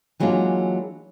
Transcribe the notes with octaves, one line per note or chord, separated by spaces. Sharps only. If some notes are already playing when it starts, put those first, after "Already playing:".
E3 F#3 G#3 A#3 D4 F4